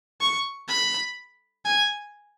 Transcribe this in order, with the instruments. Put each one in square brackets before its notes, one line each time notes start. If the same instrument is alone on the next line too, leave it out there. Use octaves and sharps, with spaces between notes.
[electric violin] C#6
B5
G#5